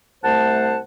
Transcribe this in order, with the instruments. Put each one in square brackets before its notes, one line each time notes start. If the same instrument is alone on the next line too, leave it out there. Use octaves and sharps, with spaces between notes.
[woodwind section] C2 A3 C5 F#5 A5